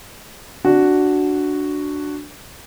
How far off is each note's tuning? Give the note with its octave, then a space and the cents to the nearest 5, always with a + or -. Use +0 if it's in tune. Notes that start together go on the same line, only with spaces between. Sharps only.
D4 +0 F#4 +0